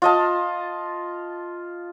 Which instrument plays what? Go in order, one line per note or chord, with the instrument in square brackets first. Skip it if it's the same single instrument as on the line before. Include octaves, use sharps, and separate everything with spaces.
[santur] F4 D#5 A5